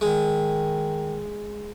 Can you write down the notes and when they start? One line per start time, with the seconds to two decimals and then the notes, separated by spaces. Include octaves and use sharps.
0.01 D#3 G#3